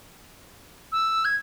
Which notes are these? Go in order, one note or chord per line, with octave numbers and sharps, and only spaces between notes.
E6
G#6